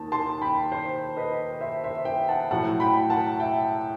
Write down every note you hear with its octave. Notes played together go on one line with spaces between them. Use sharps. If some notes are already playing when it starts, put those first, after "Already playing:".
Already playing: D#2 D#3 D#4 A5
A5 C6
G5 B5
C5
B4 D#5
C5 E5
C5 E5
E5 G5
F#5 A5
A2 F#3 A3 F#5 A5
G5 B5
F#5 A5
E5 G5